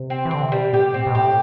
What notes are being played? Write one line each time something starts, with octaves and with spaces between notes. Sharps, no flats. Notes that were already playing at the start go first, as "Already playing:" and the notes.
Already playing: C3
C4
E3
D3 C4
C3
B2 G3
A2 G4
B2 C4
B2
A2 G4